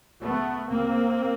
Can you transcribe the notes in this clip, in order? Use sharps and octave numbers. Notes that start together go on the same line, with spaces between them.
D2 C#3 A3 B3
D2 C#3 A#3 C4